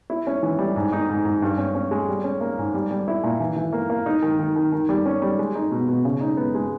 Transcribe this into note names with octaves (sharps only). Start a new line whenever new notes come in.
E4
C#4
E3
G3
G#2
D#4
G#2
G#2
G2
C#4
C#4
G#3
G3
C#4
A#3
G#2
G3
G3
E4
A#2
E3
E3
A#3
A#3
D#4
D#3
D#3
D#3
D#3
G3
C#4
G3
G#3
D#4
B2
B2
C#3
D#4
B3
G#3